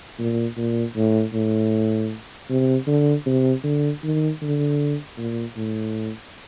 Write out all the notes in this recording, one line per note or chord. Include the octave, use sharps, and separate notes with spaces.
A#2
A#2
A2
A2
C3
D3
C3
D3
D#3
D3
A#2
A2